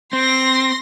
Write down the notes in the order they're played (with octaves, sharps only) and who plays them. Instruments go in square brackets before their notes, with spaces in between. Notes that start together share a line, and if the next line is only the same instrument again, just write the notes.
[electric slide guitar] C4 [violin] C6 A#6